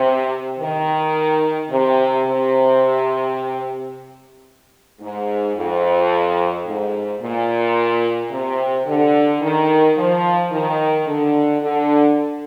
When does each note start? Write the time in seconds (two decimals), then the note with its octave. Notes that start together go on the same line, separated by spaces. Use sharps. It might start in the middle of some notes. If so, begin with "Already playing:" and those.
Already playing: C3
0.59 D#3
1.70 C3
2.25 C3
5.01 G#2
5.56 F2
6.65 G#2
7.21 A#2
8.31 C3
8.87 D3
9.42 D#3
9.97 F3
10.52 D#3
11.06 D3
11.62 D3